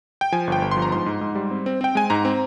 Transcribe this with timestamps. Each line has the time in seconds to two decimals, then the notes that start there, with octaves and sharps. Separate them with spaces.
0.21 G5
0.32 F3 G#5
0.47 G1 G5
0.62 G1
0.71 C6
0.77 F3
0.82 A#5
0.92 G#2 C6
1.06 G#2
1.21 G#2
1.35 G3
1.51 C4
1.66 C4
1.81 C4 G5
1.95 G#3 G#5
2.10 G#2 A#5
2.25 C4